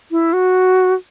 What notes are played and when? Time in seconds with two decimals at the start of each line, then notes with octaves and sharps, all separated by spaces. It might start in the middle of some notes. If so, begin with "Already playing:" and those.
0.11 E4
0.33 F#4